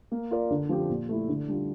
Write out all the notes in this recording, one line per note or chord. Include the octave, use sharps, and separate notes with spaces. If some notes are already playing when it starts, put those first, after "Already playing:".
A#3
F4 A#4 D5
D3
F3 C4 G4
A#2
A3 E4
D3
G3 D4 F4